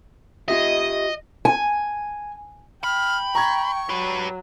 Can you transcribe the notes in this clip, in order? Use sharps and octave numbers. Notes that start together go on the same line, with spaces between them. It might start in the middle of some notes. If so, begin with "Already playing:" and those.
F4 G4 D#5 E5
G#5
G5 B5 F6
A#5 C#6 G#6
F#3 G4 B4